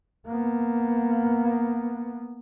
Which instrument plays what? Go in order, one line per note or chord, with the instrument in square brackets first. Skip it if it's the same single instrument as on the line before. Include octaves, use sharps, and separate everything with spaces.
[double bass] A#3 B3